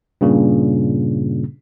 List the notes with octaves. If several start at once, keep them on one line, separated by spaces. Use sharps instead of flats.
G2 A#2 C#3